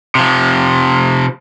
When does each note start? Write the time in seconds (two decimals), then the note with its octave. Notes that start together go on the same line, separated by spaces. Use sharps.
0.15 C3 F3